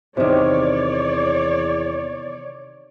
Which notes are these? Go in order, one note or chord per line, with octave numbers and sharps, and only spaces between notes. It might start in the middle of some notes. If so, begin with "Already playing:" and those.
E2 C3 D#3 C#5 D5